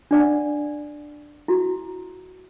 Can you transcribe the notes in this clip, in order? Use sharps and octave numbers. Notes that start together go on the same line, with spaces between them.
D4 D5 F#5
E4 F#4